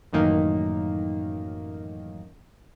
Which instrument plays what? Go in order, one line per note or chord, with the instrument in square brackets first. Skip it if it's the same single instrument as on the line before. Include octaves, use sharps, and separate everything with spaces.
[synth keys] A1 F#2 D#3 A#3